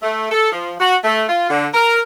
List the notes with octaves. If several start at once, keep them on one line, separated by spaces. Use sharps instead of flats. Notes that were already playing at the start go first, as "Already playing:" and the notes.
A3
A4
F3
F#4
A3
F4
D3
A#4